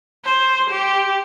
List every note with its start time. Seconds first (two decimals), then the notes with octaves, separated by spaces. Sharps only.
0.25 C5
0.71 G4